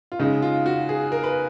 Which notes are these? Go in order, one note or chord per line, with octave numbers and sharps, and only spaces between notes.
F4
C#3 G#3 D#4
F4
F#4
G#4
A#4
B4